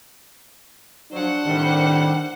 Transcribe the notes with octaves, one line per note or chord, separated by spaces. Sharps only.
F3 F#3 D4 C5 F#5
A2 C3 D#3 G3